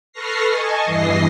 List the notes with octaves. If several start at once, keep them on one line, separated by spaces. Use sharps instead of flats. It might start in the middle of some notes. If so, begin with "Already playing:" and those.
A4 B4 C#6 F6 A#6 C7
D#5 G#5 A5 C#6
E2 G2 E3 D#5 A#6 C7